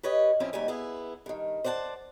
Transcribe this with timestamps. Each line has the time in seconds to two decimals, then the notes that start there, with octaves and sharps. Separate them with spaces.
0.03 G4 B4 C#5 D#5
0.40 F3 C4 C#4 E4 C5
0.53 D#2 G#2 G3 G#5
0.68 B3 E4 G#4
1.26 G2 D#3
1.64 C5 D5 F#5 G#5 A5